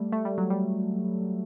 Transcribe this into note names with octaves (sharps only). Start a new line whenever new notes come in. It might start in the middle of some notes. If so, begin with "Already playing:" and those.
Already playing: G3 A3
A3
G3
F#3
G3